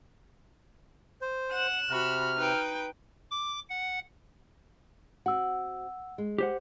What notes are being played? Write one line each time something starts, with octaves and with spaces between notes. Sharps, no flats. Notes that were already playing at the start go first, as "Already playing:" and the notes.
C5
F#5 F#6 E7
C3 F#4 B5 F6
D#4 B4 G5
D6
F#5
C4 F#4 F#5 E6
G#3
G4 C5 F#5